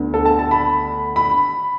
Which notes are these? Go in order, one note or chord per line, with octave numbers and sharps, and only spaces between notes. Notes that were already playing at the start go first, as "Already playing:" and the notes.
Already playing: D2 D3 B3
A4
A5
A5
B5
B5